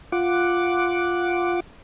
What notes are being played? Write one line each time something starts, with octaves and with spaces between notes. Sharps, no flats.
F4 F#5 D6